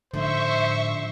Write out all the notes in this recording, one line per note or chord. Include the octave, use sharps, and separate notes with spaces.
A2 D3 F3 D#4 C5 E5 C#6